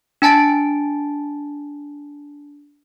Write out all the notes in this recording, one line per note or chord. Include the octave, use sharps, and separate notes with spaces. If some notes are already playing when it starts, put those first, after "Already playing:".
D4 G#5 A5 A6 D7